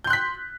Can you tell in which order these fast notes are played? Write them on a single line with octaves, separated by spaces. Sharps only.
G6 C6 F#6 B6